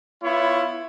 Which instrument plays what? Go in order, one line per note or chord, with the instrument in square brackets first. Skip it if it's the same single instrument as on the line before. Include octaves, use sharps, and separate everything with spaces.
[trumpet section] B3 E4 F4 C#5